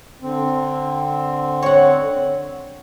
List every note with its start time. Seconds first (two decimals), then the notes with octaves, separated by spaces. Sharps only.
0.21 D3 C4
1.62 C#5 F#5